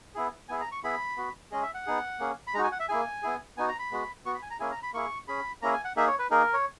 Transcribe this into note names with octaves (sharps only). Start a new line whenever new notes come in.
B3 E4 G#4
B3 E4 G#4 G#5
A#5
C#6
B3 E4 G#4 B5
B3 F#4
G#3 C#4 G#4 D#5
E5
F#5
B3 D#4 G#4
A#3 C#4 G#4
B5
G#3 D#4 F#4 A#5
G#5
F#5
E5
A#3 E4 G#4 G#5
B3 E4 G#4
B3 D#4 F#4 G#5
A#5
B5
G#3 B3 F#4
B3 F#4 C#6
B5
G#5
A#5
A#3 C#4 E4 G#4 G#5
A#5
B5
A#3 E4 G#4 C#6
C#4 G#4 B5
A#3 C#4 E4 G#4 A#5
G#5
F#5
A#3 D#4 G#4 E5
C#5
B4
A#3 D#4 G#4 A#4
C#5